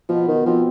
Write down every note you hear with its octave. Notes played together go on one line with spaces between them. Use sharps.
B2 F3
D#3
F3 C4